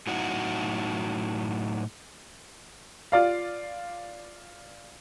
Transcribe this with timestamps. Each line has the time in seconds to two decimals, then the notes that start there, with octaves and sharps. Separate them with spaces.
0.07 A2 F#3 D#4 E4 F#4
3.12 F4 D5 F5